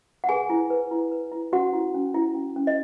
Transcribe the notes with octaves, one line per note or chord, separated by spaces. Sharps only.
F#5
G#4 B4 G#5
E4
B4
E4
B4
E4
C#4 F#4 F#5
E4
C#4
E4
C#4
C#4
D#5